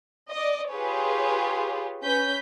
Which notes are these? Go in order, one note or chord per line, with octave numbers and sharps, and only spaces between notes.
D5 D#5
F4 G4 G#4 B4 C#5
C#4 B4 G6 B6